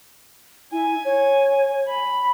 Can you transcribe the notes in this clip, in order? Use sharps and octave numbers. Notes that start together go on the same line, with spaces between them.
E4 G#5
C#5
B5